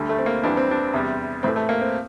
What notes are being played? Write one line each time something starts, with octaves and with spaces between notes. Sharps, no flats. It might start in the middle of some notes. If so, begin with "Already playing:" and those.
Already playing: D2 D3 G3
A3
C4
A#3
F2 E3 G3 D4
C4
D4
E2 C3 G3
A2 E3 A3 C4
A3
A#3
C4